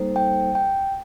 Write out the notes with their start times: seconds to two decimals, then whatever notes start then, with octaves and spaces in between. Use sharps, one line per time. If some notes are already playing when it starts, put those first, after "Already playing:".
Already playing: G3 A#3 D#4 A4 C5
0.16 G5
0.55 G5